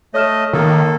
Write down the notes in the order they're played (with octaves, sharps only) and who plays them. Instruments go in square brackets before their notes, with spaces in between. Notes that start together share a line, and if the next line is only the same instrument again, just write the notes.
[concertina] A3 D#5 [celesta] C#5 F6 E7
[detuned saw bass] D#3 [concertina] A#3 A4